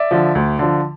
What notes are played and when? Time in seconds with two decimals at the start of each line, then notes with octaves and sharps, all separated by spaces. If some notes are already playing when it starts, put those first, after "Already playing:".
Already playing: D5 E5
0.11 D3 F3
0.35 D2
0.59 D3 F3